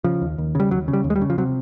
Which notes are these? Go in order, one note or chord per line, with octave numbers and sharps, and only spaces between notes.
C#3 F3
D#2
D#2
C#3 G3
D#2 F#3
C#3
G3
D#2
G#3
G3
C#3
F3
C3 F#3